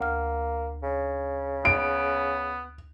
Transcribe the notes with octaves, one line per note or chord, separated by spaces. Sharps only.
D2 A#3 F6
C#3
B3 D7